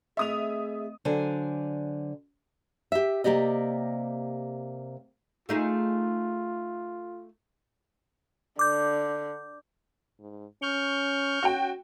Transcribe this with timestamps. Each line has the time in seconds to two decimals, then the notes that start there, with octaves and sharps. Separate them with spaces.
0.17 A3 C4 G#4 D#5 E5 D#6 F7
1.05 D3 F#3 C5 D5 G#5
2.92 G4 E5
3.24 C3 A#3 G4 D5 D#5
5.49 A3 D#4 F4 G#4
8.59 D3 D6 G6
10.20 G#2
10.62 C#4 C#6 F6 G6
11.43 C#4 F#4 G5